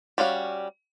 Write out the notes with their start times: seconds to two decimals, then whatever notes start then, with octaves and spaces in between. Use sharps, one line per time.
0.18 G3 C#4 F#4 F5